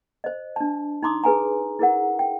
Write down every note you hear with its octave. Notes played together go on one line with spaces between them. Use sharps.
C5 D#5
D4 A5
D#4 A#5 C6 D6 D#6
G#4 B4 G#5 A#5
E4 G#4 A#4 F#5
G5